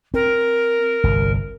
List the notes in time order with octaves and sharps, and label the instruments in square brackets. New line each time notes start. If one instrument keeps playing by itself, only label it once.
[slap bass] C4 [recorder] A#4
[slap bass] G1 C2